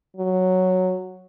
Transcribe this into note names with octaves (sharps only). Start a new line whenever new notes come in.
F#3